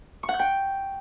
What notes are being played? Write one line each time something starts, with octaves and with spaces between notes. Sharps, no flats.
C#6
F#5
G6
G5